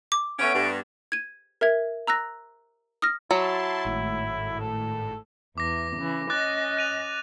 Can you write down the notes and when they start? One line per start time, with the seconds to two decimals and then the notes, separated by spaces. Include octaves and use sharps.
0.12 D6
0.39 A3 B3 C#4 F#5 D7
0.54 G2 G#5
1.12 G#6 D#7
1.61 A#4 E5 G#6
2.07 A#5 E6 F#6 A#6
3.02 D#6 F6 A#6
3.31 F#3 E4 A5 C6
3.85 G#1 A2
4.60 A4
5.58 E2 D6 A#6
5.98 C#3 E3
6.30 C#4 D#5 D6 F#6 A6
6.77 F#6 D#7 F7